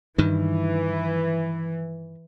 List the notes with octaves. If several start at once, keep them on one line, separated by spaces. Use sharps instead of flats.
G2 D#3 E3